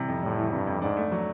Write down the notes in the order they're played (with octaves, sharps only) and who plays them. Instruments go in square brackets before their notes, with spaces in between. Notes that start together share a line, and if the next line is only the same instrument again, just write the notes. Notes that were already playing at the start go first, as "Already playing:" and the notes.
Already playing: [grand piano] C3 E3 G3
F2
[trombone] A2 [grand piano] G3
[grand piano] E3
[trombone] G2 [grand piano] C3
[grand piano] F2
[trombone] G#2 [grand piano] D4
[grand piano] A3
F#3